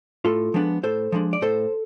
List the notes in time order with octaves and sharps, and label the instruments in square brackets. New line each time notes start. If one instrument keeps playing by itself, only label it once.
[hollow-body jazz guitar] A2 F4 A4
F3 G#3 B3 D4
A2 A4 C5
F3 G#3 B3 D4
D5
A2 A4 C5